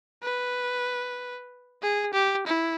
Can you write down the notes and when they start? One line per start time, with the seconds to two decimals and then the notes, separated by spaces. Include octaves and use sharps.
0.23 B4
1.82 G#4
2.13 G4
2.46 E4